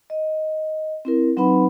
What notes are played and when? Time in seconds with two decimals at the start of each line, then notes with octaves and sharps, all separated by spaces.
0.10 D#5
1.05 C4 E4 A#4
1.37 F#3 C4 D#4 B4 F#5 B5